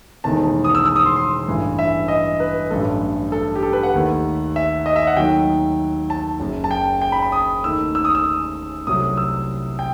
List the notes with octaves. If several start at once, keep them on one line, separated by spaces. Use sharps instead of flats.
E1 E2 D#3 A3 A5
D#6
E6
E6
D#6
C6
C6
A1 G2 E3 A3
E5
D#5
B4
A1 G2 F#3 A3 A4
A4
G4
A4
B4
F#5
D#2 D#3 A3
E5
D#5
E5
F#5
D#2 D#3 F#3 A3 G5
A5
F#1 F#2 F#3
A5
G5
G5
B5
B5
D#6
D#2 D#3 A3 E6
E6
D#6
E6
C2 C3 F#3 A3 D#6
E6
G5